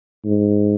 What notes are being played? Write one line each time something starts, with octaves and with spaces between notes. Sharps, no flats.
G#2